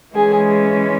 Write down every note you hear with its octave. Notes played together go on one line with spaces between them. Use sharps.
E3 G#3 C#4 G#4